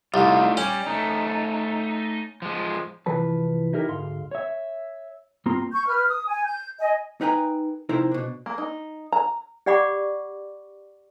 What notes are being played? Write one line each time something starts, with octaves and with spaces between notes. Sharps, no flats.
C2 A3 D#4 F4
G3 C#4
A3 D#4
F3 G#3
C2 E3 F3 B4 A5
D#4 E4 G4 A#4
D2 G#2 F5 C6
C#5 E5
G2 A#3 C4 F4 A#5 C6
C#6 G6
B4 F6
D#6
G#5
G6
D#5 G#5
D#4 A#4 B4 G5 G#5 A#5
C3 F3 D#4 E4 A#4 C5
B2 D4
A#3
D#4
A#5
G4 D5 F#5 B5 C#6 D6